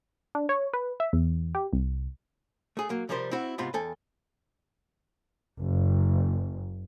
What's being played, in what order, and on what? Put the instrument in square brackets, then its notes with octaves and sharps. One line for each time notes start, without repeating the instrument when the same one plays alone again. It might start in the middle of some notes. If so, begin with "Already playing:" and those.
[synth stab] D4
C#5
B4
E5
E2
G4
C2
[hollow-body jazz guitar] A3 G#4
F#3 A#3
C3 F3 G3 A#4 C5
C4 E4 F#4
C#2 G#2 C3 B3 F4 B5
E2 A4 G5 G#5
[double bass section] F#1